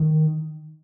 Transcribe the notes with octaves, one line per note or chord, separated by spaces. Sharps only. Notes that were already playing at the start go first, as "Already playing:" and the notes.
Already playing: D#3